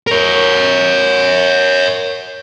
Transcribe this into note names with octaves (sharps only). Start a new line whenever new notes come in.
A#4 C#5